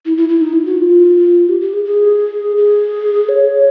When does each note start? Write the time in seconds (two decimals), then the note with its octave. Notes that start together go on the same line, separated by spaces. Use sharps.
0.06 E4
0.17 E4
0.29 E4
0.41 D#4
0.53 E4
0.65 F#4
0.78 F4
1.49 G4
1.61 G4
1.74 G#4
1.85 G#4
2.57 G#4
3.29 C#5